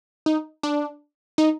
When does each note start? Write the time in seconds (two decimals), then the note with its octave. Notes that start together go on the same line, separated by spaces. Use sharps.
0.26 D#4
0.63 D4
1.38 D#4